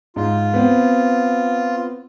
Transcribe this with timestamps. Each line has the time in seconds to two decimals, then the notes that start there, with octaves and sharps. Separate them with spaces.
0.16 G#2 F4
0.54 B3 C4